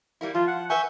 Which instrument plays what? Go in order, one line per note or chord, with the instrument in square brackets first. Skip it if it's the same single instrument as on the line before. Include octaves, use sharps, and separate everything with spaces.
[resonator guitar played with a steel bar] G3 A#3 E4
[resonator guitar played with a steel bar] F3 [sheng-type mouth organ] F4
[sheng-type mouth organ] F#5
[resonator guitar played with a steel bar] B4 F#5 G#5 [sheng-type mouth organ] E5 C#6 G6